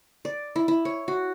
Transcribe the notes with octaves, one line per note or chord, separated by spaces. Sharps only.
D5
E4
E4
C#5
F#4